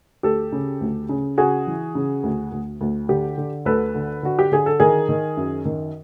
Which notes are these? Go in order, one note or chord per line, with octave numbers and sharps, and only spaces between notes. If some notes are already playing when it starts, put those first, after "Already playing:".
D2 G4 A4
C#3
D2
C#3
C#3 F#4 G#4
E3
C#3
D2
D2
D2
D3 G4
D3
D2 A4 B4
D3
D3 F#4
G4
D3 G#4
A4
D#3 G#4 A#4
D#3
F#2
D#3